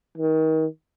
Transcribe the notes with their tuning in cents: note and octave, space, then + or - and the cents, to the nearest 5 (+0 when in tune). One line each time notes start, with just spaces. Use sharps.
D#3 +30